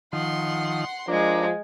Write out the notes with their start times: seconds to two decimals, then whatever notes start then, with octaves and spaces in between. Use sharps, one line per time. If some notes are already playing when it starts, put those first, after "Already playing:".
0.13 D#3 F3 F#5 C6
1.08 F3 G#3 D4 A#4